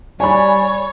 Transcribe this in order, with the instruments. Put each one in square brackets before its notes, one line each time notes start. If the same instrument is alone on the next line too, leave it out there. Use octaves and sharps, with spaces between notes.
[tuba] G3 [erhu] C#5 [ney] D5 [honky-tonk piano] G#5 B5